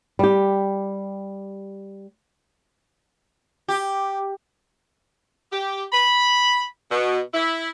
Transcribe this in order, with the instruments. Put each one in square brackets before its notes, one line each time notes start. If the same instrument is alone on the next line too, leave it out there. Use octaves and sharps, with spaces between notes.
[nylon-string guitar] G3 G4
[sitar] G4
[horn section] G4
B5
B2
E4